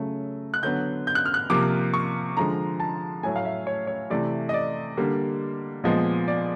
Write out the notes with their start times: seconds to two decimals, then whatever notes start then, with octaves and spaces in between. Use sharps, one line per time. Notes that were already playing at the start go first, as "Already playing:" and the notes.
Already playing: C#3 F#3 A3
0.54 F#6
0.63 D3 F#3 B3 G6
1.07 G6
1.15 F#6
1.26 F6
1.34 F#6
1.50 C3 F3 A#3 D6
1.94 C#6
2.37 D3 F3 G#3 A#5
2.80 A5
3.23 A2 F#3 A3 G#5
3.36 F5
3.45 E5
3.67 C#5
3.87 C#5
4.10 C3 E3 A3 D5
4.49 D#5
4.54 D5
4.97 D3 G3 A#3
5.84 A#2 F3 G#3 B3 D#5
6.28 D5